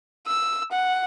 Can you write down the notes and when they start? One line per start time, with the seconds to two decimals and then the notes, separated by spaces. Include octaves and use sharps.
0.27 E6
0.72 F#5